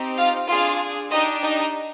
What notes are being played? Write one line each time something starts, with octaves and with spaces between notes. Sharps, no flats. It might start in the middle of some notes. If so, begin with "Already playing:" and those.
Already playing: C4 D#4 G4
F4 F5
D4 F4 G#4 F5
D4 D#4 G4 D#5
D#4 D#5